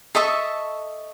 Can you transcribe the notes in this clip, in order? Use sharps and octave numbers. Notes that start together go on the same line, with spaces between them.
A4 D#5 E5 C#6